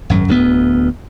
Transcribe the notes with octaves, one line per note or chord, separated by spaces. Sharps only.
G#1 F#2
D1 D2 A3 B3